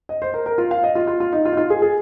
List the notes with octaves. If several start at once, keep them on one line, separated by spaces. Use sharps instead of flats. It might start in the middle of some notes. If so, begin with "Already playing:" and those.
D#5
C5
A#4
A#4
F4
F5
D#5
F4
F4
F4
D#4
F4
D#4
F4
G#4
G#4